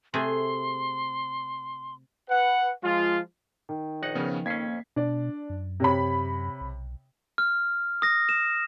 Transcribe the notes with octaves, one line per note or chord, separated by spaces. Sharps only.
C3 A3 G#4 C6
B4 F#5
F3 G#3 F4
D#3
A#1 D#4 F#5 F#6
C#3 F3 B3 C#4
F2 A#3 C#4 G#6 B6 C7
B2 D4 D5
F#2
C3 C#5 B5
B1
F6
D#6 A#6
E7